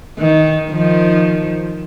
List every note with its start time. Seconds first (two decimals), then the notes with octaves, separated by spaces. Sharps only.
0.18 D#3
0.71 D#3 F3